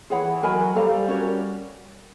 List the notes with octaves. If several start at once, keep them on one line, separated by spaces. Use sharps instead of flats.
E3 G#4 C#5 F#5 B5
F#3 A#4 D#5 G#5 B5
G3 A4 C5 F5 A#5
C#4 F#4 A#4 C#5